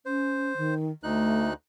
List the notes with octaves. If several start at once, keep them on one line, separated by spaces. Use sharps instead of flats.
C#4 C5
D#3
D2 A3 D#4 F#6